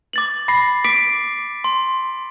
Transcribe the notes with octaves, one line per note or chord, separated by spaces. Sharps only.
D6 A6 F#7
B5 A#6 C7
D6 B6 C7 D7
C6